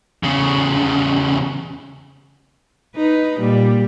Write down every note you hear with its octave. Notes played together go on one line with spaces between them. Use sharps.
E2 C#3
D#4 B4
A#2 G3